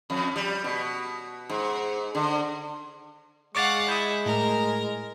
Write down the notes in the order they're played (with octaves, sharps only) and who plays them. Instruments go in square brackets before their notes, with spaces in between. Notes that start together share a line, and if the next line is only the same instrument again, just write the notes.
[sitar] F2
G3
B2
G#2
D3
[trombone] G#3 [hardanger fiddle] F5 F#5 [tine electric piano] C#6 D6 A6
[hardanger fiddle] E4 [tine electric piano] D#6 G6
[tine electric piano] A2 [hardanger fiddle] A#4